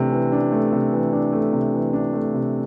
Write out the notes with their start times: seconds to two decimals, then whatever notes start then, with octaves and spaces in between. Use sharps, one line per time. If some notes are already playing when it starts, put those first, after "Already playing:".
Already playing: C3 E3 A3 D4
0.12 E3
0.32 D4
0.52 A3
0.73 C3
0.92 E3
1.13 D4
1.33 A3
1.53 C3
1.74 E3
1.93 D4
2.13 A3
2.34 C3